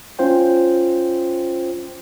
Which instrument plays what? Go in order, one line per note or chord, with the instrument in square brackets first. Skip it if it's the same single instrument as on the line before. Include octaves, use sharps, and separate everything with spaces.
[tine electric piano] C#4 F4 C5 G5